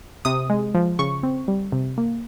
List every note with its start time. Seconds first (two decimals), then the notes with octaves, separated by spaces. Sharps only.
0.25 C3 D#6
0.50 G#3
0.74 F3
0.99 C#3 C#6
1.23 C4
1.48 G3
1.72 C3
1.98 A#3